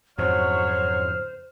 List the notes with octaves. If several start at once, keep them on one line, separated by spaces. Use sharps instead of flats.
F2 G#2 C#3 F#3 C5 C#5 F6